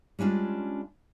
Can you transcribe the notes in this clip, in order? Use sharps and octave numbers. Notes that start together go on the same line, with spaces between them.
G3 G#3 C#4 D4 F4